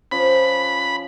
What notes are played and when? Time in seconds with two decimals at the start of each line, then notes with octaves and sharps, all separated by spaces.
0.12 F3 C#4 B5